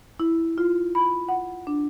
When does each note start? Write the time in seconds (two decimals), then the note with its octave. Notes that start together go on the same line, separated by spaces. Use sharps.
0.20 E4
0.58 F4
0.95 B5
1.29 F#5
1.67 D4